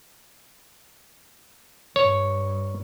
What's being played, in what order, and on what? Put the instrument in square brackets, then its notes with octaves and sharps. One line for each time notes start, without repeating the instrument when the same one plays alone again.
[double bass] G2 [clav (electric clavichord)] C#5